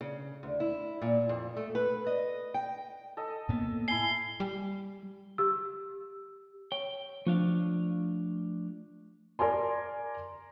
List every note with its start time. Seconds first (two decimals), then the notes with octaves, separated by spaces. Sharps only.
0.01 C#3
0.43 D2
0.60 E4
1.02 A#2
1.29 F2
1.56 A3
1.75 B4
2.07 D#5
2.54 G5
3.17 A4 D#5
3.49 A2 A#3 B3
3.88 E4 G#5 C7 G7
4.40 G3
5.38 G4 E6
6.72 C#5 G5
7.27 F3 A3 D4 F5
9.39 A#4 D5 G#5 C6